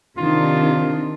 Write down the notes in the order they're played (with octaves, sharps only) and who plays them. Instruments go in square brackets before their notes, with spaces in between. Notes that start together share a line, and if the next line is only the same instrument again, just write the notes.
[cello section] C3 D#3 D4 [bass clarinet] F4